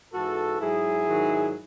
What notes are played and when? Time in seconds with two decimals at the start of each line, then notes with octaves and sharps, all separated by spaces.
0.12 G#2 E3 F#4 A4
0.60 G#2 F#3 E4 G#4
1.08 G#2 D#3 F#3